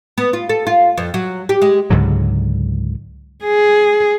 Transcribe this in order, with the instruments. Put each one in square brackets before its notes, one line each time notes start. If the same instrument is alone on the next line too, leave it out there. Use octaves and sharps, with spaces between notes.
[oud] B3
F4
A4
F4
F2
F#3
G4
G#3
[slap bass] C#2 G#2 D3 F#3
[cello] G#4